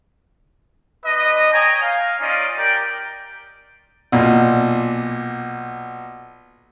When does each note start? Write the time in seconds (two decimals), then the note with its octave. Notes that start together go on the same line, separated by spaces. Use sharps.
1.05 D4 B4 D#5
1.53 C#5 D#5 G5 G#5 A#5
1.83 F5
2.20 C#4 D#4 F4 D5 D#5
2.57 G4 A#4 D5 G5
4.12 B1 A#2